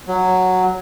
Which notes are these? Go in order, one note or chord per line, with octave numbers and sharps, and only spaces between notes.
F#3